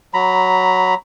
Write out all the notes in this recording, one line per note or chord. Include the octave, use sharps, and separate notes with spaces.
F#3 A#5 B5